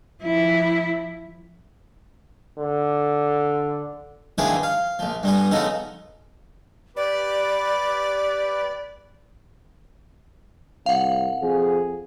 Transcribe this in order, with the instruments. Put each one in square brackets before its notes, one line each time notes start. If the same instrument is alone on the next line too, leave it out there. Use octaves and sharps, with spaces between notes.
[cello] F3 E4
[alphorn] D3
[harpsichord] D#3 F3 D4 E4 G#4 B4
F5
A#1 F3
G2 G3 B3 G#5
C#3 F3 B3 D#4 F#4 A4
[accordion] G4 B4 B5 [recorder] D5
[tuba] C2 [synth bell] F5 F#5
[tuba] F2 [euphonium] G#4